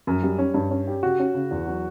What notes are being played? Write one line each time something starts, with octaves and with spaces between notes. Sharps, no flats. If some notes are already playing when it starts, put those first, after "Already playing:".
F#2
G3
C#4
G2
C#4
G4
C#3 F#4
C#4
C#3
E2
F#3